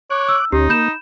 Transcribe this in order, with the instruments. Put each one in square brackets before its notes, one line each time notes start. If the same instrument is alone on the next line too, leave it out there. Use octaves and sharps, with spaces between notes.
[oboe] C#5 [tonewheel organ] D6 F#6
[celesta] E6
[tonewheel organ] D2 C#4 [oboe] D#4 [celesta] G4
[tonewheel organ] A#3 [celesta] B5 G6 E7